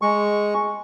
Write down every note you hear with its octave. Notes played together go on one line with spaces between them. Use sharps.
G#3 C#6